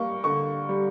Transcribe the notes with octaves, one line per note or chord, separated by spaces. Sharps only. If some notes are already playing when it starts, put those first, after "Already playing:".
Already playing: G3 A#3 C#6
D3 C#6
G3